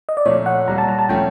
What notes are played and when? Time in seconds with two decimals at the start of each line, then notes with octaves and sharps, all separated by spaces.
0.09 D#5
0.17 D5
0.25 A#2 F3 A3 C#5
0.46 F#5
0.68 A#2 G3 A#3 A#5
0.78 A5
0.89 A#5
0.99 A5
1.09 F3 A3 C#4 G5